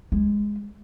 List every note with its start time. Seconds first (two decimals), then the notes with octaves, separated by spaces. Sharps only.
0.12 G#3